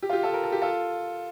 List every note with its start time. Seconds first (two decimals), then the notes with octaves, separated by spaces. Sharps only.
0.02 G4
0.09 F4
0.13 G4
0.23 F4 A4
0.34 A#4
0.43 A4
0.52 G4
0.62 F4 A4